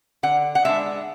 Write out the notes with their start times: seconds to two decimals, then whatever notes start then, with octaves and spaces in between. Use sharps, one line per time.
0.23 D3 F#5
0.55 F#5
0.65 G#3 B3 D4 E5